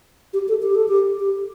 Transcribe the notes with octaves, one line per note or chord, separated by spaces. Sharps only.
G4
A4
G4
A4
G4
G4